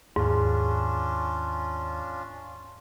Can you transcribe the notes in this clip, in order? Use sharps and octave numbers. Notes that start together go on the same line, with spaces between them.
D#2 G#2 C#4 D4 F4